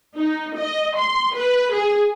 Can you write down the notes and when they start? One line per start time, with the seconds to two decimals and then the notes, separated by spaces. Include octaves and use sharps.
0.17 D#4
0.58 D#5
0.97 C6
1.35 B4
1.73 G#4